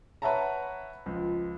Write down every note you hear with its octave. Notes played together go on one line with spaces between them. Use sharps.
B4 C#5 E5 F#5 A5 A#5
C#2 F3